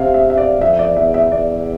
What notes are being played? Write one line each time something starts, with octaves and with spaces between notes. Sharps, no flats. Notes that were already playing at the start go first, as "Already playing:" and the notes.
Already playing: C3 E5 F5
E5
E5
D5
F2 E5
D5
E2 E5
E5
E2 D5